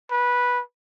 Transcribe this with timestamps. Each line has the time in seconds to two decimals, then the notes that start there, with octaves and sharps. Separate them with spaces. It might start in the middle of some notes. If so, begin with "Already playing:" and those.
0.11 B4